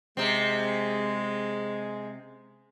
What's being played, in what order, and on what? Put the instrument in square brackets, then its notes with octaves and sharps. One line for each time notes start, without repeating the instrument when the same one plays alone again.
[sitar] C3 C4 [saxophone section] G#3